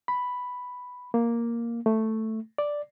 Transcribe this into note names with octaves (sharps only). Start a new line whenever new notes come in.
B5
A#3
A3
D5